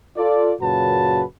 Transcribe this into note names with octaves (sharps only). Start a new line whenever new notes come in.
F4 A4 D5
F#2 A#2 C#3 F#4 B4 A5